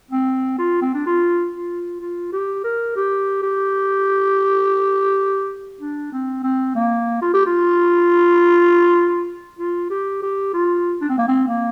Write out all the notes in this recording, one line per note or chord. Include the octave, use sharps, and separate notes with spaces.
C4
F4
C4
D4
F4
F4
F4
G4
A#4
G4
G4
D4
C4
C4
A#3
F4
G4
F4
F4
G4
G4
F4
D4
C4
A#3
C4
A#3